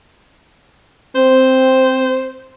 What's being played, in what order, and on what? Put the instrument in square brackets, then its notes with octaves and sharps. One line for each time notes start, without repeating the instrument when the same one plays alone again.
[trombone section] C4 [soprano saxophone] C5